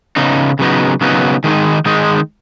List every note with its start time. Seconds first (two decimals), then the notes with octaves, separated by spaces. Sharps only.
0.16 C#3 B3 D#4
0.59 C#3 F#3 B3 D#4
1.01 C#3 F#3 B3 D#4
1.44 D#3 G#3 D#4
1.86 D#3 G#3 D#4